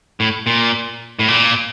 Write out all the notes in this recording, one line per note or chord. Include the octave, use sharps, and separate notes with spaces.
A2
A#2
A2
A#2